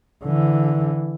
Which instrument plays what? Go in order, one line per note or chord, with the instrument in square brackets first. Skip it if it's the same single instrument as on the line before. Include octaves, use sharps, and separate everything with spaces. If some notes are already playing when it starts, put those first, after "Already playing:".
[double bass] D3 E3